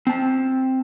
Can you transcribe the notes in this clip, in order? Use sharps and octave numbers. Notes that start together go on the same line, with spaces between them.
C4 A5